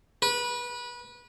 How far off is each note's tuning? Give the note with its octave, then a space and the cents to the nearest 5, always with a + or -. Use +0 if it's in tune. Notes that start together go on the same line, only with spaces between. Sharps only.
B4 -25